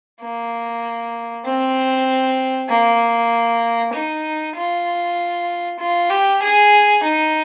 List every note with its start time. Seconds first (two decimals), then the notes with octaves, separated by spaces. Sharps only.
0.22 A#3
1.46 C4
2.70 A#3
3.93 D#4
4.56 F4
5.79 F4
6.10 G4
6.42 G#4
7.03 D#4